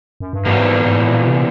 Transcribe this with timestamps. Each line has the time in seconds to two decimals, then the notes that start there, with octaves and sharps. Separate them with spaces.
0.20 F#2
0.33 G2
0.45 E2 G#2 B2 G3 A#3
0.86 G#2
0.98 A2
1.10 A#2
1.27 C3